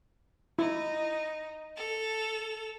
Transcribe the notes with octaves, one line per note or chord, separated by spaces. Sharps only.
D#4 E4
A4 F7